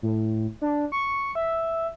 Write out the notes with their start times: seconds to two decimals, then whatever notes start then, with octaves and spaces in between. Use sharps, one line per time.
0.02 A2
0.62 D4
0.92 C#6
1.35 E5